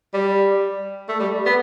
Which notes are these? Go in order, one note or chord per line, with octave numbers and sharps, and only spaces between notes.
G3
A3
G3
B3